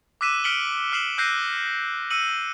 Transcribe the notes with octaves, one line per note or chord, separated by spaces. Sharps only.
D6 E6 F#6 B6 D#7 E7
F6 B6 C#7 D7 F#7 G7
F6 C7 E7 F#7
E6 F#6 G6 A#6 C7 D#7
E6 C#7 D#7 F#7